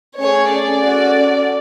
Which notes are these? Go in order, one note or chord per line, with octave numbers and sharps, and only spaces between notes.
A3 C#4 G#4 C#5
D5
C#4 F#4 A4